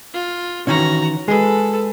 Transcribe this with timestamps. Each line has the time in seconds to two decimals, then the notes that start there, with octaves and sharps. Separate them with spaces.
0.14 F4
0.67 D#3 E3 C#4 F#4 A#5
1.28 G#3 G#4 A4 B4